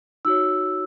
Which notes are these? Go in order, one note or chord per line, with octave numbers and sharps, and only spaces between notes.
D#4 F#4 C#5 E6